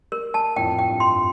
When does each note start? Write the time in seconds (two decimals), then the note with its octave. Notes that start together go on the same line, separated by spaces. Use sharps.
0.12 A#4
0.34 A5
0.56 F2 A2 G5
0.79 G5
0.89 G2
1.00 C6